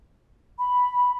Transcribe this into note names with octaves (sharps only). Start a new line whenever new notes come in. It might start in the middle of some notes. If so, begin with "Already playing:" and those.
B5